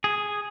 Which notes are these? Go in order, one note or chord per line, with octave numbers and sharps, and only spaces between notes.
G#4